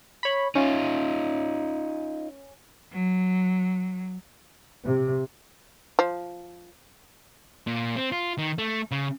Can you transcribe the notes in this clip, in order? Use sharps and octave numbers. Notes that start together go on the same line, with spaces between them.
C#5 B5
C#4 D#4 F4
F#3
C3
F3
A#2
C4
F4
D#3
A3
C#3